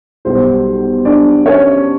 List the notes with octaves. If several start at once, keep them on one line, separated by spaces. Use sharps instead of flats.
B1 B2 G3 C5
D4 D5
C#4 C#5